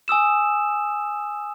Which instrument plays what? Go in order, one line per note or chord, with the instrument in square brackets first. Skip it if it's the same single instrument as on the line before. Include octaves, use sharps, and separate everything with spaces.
[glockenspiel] G#5 D#6 E6 E7